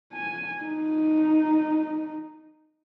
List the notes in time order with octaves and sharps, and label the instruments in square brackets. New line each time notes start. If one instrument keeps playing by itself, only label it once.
[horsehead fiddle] G#5
D#4